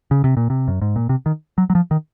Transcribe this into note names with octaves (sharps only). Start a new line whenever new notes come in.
C#3
C3
A#2
C3
F#2
G#2
A#2
C3
D#3
F#3
F#3
F3
D#3